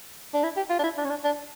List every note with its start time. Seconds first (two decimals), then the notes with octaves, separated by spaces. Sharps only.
0.34 D4
0.44 E4
0.57 G4
0.70 F4
0.79 D4
0.84 E4
0.98 D4
1.05 C#4
1.10 D4
1.24 D4